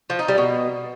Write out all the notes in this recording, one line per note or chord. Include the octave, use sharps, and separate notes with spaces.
F3
D#4
G3
B2